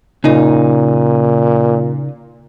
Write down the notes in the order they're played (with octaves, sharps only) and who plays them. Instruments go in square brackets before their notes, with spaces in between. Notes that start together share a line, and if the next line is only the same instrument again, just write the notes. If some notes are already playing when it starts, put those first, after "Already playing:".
[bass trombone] A#2 [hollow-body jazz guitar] C#3 D#4